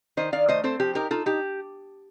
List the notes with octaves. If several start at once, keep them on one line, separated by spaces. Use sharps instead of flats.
D#3 C5 D#5
D#3 D5 F5
A3 C5 D#5
C4 A4 C5
F3 G4
D#4 G4 A#4
D#4 F4 A4
D#4 G4